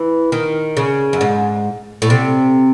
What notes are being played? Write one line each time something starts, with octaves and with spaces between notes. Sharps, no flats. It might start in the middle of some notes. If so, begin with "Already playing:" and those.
Already playing: E3
D#3
C#3
F#2
G#2
A2
C3